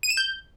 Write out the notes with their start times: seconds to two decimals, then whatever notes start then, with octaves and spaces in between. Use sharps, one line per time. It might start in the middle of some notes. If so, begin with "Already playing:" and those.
0.03 D#7
0.10 E7
0.17 G6